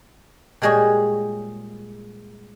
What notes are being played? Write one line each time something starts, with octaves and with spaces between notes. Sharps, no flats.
A#2 G3 G#3 G#4 C#5